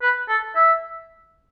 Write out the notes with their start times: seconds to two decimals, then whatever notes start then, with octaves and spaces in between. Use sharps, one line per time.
0.01 B4
0.28 A4
0.55 E5